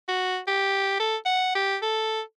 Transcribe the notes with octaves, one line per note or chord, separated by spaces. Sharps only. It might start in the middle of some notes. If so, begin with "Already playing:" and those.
F#4
G4
A4
F#5
G4
A4